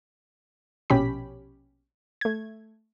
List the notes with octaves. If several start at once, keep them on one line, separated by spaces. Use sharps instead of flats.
A#1 B2 C#4 G4 B5 B6
A3 G#6